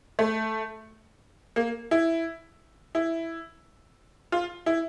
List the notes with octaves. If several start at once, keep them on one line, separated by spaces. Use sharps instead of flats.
A3
A#3
E4
E4
F4
E4